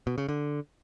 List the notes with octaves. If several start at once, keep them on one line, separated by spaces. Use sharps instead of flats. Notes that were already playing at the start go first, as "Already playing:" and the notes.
B2
C#3
D3